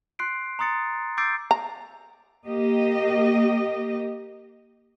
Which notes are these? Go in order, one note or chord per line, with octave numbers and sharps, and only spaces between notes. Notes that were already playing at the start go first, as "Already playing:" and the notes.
C6 F#6 C7 D7
A#5 C6 D#6 A6 C#7
D6 E6 G6 A6 C7 D7
A#5
A#3 G4 D#5